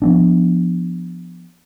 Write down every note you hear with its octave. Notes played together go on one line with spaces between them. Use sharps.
F3 B3 D4